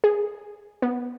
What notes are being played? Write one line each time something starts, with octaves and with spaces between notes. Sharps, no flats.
G#4
B3